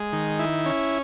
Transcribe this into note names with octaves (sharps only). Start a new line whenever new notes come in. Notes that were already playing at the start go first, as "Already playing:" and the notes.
Already playing: G#3
D#3
E4
C#4